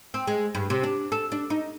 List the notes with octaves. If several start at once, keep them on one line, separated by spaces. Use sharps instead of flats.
C4
G#3
G2
C3
D4
A4
D4
D#4